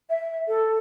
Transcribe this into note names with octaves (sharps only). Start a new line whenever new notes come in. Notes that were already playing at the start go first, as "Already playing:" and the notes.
E5
A4